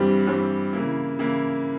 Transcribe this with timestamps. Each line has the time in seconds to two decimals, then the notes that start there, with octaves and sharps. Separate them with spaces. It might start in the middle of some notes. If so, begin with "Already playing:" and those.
Already playing: G2 E3 G3 C4 G4
0.27 G2 E3 G3 C4 G4
0.73 C#3 E3 A#3 E4
1.19 C#3 E3 A#3 E4